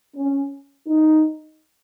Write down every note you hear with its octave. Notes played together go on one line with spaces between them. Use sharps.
C#4
D#4